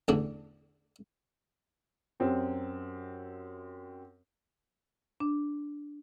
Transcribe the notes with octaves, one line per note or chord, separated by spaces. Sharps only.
A1 E2 D3 D4
F#2 C4 G4
D4